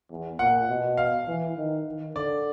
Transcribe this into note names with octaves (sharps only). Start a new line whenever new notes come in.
E2
A#2 F#5
B2
F5
E3
D#3
D#3
D3 D5